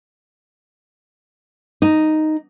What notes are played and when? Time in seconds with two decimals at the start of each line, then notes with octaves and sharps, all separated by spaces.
1.82 D#4